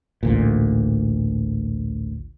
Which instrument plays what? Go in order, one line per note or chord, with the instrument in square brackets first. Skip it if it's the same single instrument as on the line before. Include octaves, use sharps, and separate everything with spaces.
[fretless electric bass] A1 D2 A#2